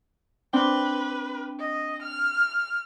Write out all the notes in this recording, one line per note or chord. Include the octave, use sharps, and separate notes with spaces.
C4 D4 B4 G5
D#5
F6